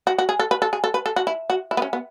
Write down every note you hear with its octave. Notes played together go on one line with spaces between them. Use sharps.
F#4
F#4
G#4
A4
B4
A4
G#4
A4
B4
A4
F#4
E4
F#4
E4
B3
C#4
B3